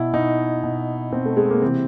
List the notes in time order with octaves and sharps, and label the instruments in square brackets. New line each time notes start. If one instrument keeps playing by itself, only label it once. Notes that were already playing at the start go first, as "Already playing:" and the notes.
Already playing: [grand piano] B2 E4
B2 D#4
B2
B2 C4
A3
G#3
A#3
C3 E3 C4